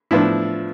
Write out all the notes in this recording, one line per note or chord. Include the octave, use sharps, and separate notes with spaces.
A2 F3 B3 D4 E4